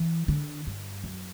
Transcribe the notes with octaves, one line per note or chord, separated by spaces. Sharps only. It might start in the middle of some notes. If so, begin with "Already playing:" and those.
Already playing: E3
D3
G2
F#2